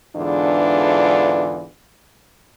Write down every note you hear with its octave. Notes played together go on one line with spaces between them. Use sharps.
E2 G#2 D3 E3 D4 F4